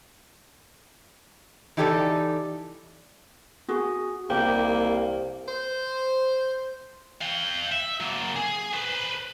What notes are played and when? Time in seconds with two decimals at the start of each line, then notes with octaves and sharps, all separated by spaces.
1.77 E3 D#4 G4 A4 A#4 D5
3.68 F#4 G#4
4.30 C2 A#3 G4
5.48 C5
7.21 F5 G5
7.72 E5
8.00 F#3 A#3
8.36 G#4
8.74 B4 C5